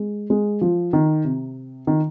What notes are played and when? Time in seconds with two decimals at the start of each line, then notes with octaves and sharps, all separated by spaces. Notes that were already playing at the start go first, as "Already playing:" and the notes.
Already playing: G#3
0.30 G#3
0.61 F3
0.93 D#3
1.24 C3
1.87 D#3